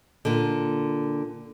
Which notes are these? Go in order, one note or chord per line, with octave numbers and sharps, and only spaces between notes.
A#2 D3